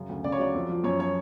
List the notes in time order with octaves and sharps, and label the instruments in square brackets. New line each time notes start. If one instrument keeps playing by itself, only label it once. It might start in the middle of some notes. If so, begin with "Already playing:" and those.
Already playing: [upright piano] F#2 C#3
D2
C#3 D5
C#5
F#3 D5
F2
F3
F#2 C#5
F3 C#5